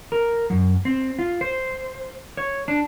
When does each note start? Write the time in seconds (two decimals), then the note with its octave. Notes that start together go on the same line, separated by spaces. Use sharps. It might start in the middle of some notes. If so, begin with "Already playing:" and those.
0.12 A#4
0.50 F#2
0.85 C4
1.19 F4
1.41 C5
2.37 C#5
2.68 D4